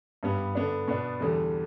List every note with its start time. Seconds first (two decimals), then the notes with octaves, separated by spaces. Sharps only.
0.23 G2 G3 B3
0.55 D3 B3 D4
0.88 B2 B3 D4
1.20 E2 D3 G3